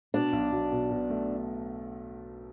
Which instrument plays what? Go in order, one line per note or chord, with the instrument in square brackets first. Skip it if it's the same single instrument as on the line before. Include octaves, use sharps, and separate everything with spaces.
[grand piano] B2 [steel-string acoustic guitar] D4
[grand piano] B1
B1
B2
B2
A3